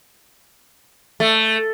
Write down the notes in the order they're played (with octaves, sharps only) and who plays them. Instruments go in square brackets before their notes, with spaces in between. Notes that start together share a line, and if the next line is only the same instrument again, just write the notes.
[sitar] A3